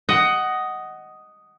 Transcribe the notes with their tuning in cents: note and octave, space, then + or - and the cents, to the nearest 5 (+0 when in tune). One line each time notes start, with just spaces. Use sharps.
D#5 +0 F#5 +15